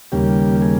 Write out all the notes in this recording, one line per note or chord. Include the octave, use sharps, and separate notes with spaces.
D#2 C#3 G3 A#3 G4
G#4